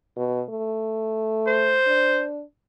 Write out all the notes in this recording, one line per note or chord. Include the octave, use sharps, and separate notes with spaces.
B2
A3
C5
D4